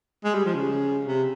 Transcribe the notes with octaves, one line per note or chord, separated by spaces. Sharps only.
G#3
G3
F3
C#3
C3